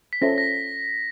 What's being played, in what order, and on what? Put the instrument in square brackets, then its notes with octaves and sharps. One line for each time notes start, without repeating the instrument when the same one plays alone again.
[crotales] B6
[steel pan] C#4 F4 A4 C5 E5 [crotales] A#6
[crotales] A#6